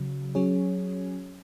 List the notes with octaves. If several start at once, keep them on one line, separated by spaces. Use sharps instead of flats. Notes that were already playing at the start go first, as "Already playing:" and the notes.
Already playing: C#3 F#3
F#3 C#4 G#4 C#5